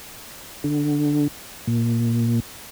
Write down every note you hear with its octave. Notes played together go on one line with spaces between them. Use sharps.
D3
A#2